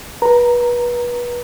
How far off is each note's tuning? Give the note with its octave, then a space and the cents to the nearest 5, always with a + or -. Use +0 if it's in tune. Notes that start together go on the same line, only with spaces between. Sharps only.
B4 -30 A#5 -5